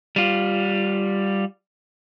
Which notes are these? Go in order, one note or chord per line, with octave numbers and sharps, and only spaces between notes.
G3 F4